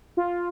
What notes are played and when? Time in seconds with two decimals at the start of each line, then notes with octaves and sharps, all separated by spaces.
0.17 F4